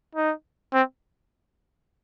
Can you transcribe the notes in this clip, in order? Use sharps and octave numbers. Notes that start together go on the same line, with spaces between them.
D#4
C4